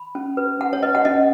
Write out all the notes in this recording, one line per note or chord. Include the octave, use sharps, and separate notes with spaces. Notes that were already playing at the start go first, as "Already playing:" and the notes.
Already playing: B5
C#4
B4
C#4 F#5
C#5
B4 D#5
F#5
C#4 D#5